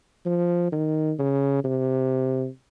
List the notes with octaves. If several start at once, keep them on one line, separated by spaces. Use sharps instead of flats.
F3
D#3
C#3
C3